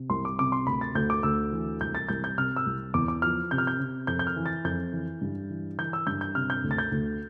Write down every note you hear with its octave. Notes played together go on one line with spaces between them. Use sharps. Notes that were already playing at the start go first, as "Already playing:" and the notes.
Already playing: C3
C2 C6
D6
C3 D6
C6
D2 B5
A6
D2 G6
D6
D2 E6
E3
C2 G6
A6
C2 G6
G6
C3 F6
E6
C2
E2 D6
D6
F3 F6
C3 G6
F6
G6
C3
F2 G6
G6
F6
E3
A6
F2 G6
E3
G2
E3
E3 G6
E6
G2 G6
G6
C3 F6
G6
D2
A6
G6
D2